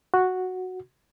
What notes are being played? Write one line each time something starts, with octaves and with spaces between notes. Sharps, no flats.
F#4